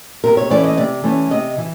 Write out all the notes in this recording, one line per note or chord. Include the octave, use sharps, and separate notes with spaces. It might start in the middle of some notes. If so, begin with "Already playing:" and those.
C3 A#4
C#5
E3 A3 C#4 D5
D#5
C3 D5
E3 A3 C#4
C3 D#5
E3